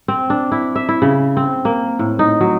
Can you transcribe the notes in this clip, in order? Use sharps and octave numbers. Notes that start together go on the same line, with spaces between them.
C4
D4
E4
E5
E4
C#3
C4
A#3
A2
D#4
F#3